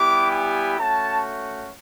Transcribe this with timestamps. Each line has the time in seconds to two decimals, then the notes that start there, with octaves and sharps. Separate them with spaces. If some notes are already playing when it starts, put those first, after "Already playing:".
Already playing: G3 B3 E4 G4 D6
0.31 G#5
0.78 A3 C#4 F#4 A5